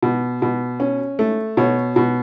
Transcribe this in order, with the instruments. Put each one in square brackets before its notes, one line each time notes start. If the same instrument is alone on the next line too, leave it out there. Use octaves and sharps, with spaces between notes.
[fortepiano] B2
B2
C#4
A3
B2 C#5
B2